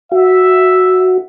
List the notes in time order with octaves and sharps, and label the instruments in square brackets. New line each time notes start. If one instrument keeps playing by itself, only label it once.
[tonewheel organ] F#4 [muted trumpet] E5